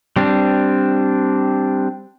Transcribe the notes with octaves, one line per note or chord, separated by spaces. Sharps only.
G3 C4 D4